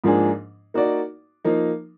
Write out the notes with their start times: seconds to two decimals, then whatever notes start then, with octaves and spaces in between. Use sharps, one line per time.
0.04 G#2 F3 A#3 D4 G#4
0.74 A#3 D#4 F#4 D5
1.45 F3 A#3 D#4